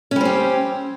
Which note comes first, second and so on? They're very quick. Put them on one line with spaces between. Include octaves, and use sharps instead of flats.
C#4 G3 C4 G4